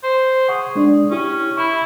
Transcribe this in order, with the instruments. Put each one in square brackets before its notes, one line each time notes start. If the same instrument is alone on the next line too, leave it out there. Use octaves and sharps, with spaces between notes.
[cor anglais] C5
[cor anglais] G#4 [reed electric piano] F#5 C#6
[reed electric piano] G#3 D4 D5
[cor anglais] C#4 [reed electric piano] E4 G4
[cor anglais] E4 [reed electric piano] B5 C#6